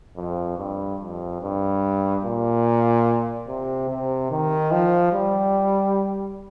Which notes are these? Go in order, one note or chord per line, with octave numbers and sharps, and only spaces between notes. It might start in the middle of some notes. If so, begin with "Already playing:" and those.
F2
G2
F2
G2
A#2
C3
C3
D#3
F3
G3